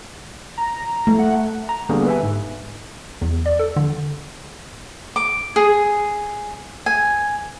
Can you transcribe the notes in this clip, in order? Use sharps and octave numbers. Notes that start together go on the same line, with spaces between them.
A#5
A3
F#5
A#5
D3 G3 A#3 B3 G4 G#4
B4 E5 G#5
G#2
E2
D5
A4
D3
D6
G#4
G#5